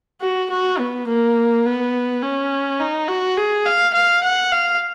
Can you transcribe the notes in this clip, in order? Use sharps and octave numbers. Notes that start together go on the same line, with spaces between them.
F#4
F#4
B3
A#3
B3
C#4
D#4
F#4
G#4
F5
F5
F#5
F5